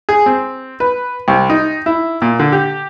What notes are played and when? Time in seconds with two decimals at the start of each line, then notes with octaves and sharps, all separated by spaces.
0.09 G#4
0.26 C4
0.80 B4
1.28 C2
1.50 D#4
1.86 E4
2.22 A#2
2.39 D3
2.52 G4